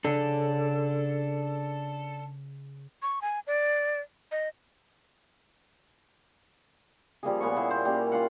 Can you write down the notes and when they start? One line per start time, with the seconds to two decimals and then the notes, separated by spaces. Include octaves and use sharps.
0.05 C#3 D4 A4
3.02 C#6
3.22 G#5
3.47 D5
4.32 D#5
7.23 F3 G3 A#3 G#4
7.40 A#2 B3 C#5 C#6
7.57 A#3 E4 C5
7.71 C5
7.85 G3 A#3 C#4
8.12 F4 F5 F#5